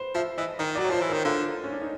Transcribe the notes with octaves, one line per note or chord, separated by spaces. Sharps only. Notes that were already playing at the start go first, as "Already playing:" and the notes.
Already playing: B4 C5
F3 E5
E3 D#5
D#3 D#5
F#3 D5
C#5
F3 C5
E3
D#3 A#4
D3 F4
C#4
D4
D#4